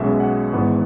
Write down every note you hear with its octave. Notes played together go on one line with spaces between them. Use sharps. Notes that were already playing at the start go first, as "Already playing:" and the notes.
Already playing: B1 B2 G#3 C#4 E5
F#5
G#1 G#2 E3 B3